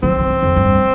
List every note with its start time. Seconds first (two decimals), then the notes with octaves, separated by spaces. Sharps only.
0.02 F3 C4
0.18 F3
0.29 D#3
0.43 F2
0.56 G2